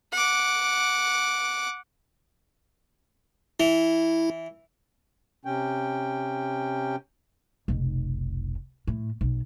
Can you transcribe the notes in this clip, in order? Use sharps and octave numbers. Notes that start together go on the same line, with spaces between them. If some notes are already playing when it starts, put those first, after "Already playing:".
F#5 D6
E3 E4
C3 C#4 G5
F1 B1
A2
B1